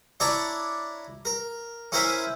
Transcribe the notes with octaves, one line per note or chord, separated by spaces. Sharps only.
D4 E4 C#5 D5 A#5
A#4
C#4 E4 A#4 C5 E5 G#5